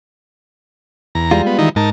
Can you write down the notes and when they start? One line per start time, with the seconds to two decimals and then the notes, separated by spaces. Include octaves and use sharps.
1.15 E2 A#5
1.31 G3 G#3 F4
1.46 B3
1.58 D#3 E3 D#4
1.76 G#2 D#4 A#4 A5